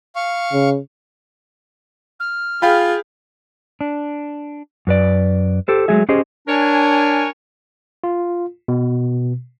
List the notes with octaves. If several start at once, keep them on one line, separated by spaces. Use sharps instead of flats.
F5 C#6
C#3
F6
F4 G#4 F5 G5 B5
D4
F#2 B4 D5
G4 A4 C5
F#3 G#3 A3 G#4 E5
C#4 G4 G#4 C5 D#5
D4 A#4 C#5 G#5
F4
B2